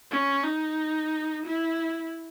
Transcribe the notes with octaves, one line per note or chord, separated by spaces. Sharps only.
C#4
D#4
E4